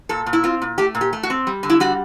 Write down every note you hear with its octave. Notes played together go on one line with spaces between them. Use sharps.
A#2 A4
A#2
E4
C4 F4
A#2
A3 G4
A#2
G4
A3
F#4
C4
G3
D3
E4
G3 F#4